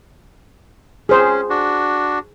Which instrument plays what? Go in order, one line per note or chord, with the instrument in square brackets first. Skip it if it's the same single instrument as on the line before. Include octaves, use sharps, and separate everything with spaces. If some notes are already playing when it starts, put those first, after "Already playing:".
[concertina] C#4 [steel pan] G#4 C5
[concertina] D4 F#4